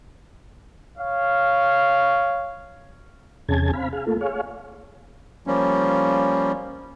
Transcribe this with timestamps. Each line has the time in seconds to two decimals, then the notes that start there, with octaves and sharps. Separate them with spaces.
0.98 C#5 F5
3.48 E2 C3 C#4 G#4 A5 G#6
3.73 C4 F5 B5
3.93 G#4 F5
4.07 A3 A#3 F4 A4
4.21 G#4 C#5 F5
5.47 F3 G3 A#3 C#4